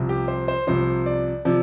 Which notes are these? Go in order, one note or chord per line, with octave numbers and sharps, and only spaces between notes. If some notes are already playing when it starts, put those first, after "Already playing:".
Already playing: C2 C3 F3
G4
C5
C5
C2 C3 F3 C5
D5
C3 F3 D5